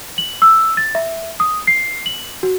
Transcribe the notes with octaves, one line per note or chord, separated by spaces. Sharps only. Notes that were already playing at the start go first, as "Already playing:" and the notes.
F#7
E6
A6
E5
D#6
C7
F#7
F#4